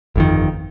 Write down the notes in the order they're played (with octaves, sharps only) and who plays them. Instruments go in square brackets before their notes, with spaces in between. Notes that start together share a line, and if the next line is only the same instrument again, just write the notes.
[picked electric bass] G1 F2 D#3